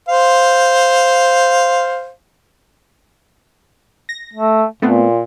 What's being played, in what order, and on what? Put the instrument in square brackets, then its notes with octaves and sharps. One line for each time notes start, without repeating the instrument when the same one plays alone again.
[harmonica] C5 F5
[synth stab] A#6
[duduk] A3
[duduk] A#2 [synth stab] A3 B3 C4